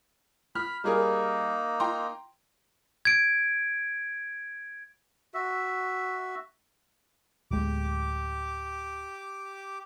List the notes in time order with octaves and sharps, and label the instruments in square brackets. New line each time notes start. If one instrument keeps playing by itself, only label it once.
[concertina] B5 [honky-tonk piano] F6
[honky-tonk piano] G3 G#4 A#4 [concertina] A#3 D#4
[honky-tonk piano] G5 A#5 C6
[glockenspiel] G#6 D7
[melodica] F#4 E5
[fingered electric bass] D1 G#3 [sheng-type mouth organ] G4 D6